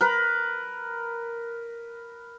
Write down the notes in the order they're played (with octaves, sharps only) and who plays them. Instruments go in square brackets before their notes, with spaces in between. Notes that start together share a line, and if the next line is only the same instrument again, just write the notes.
[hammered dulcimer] A#4 B4